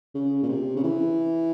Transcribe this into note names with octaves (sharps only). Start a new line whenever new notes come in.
C#3
A#2
C3
C#3
E3